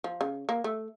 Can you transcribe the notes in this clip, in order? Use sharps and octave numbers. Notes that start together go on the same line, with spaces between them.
F3
C#3
A#3
A3